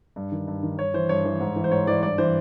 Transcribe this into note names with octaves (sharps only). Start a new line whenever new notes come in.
G2
D#3
G2
D#3
G2 C#5
E3 C5
G2 C#5
E3
G#2
E3
C5
G#2 C#5
E3 D5
G2 D5
E3 C5